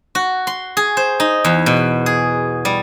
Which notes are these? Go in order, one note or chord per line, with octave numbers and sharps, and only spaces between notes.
F#4
C6
G#4
C5
D#4
E2
B2
G#4
G3